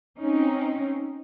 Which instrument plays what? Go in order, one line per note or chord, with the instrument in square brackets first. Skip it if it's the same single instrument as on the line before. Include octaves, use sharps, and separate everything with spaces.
[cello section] C4 C#4 D#4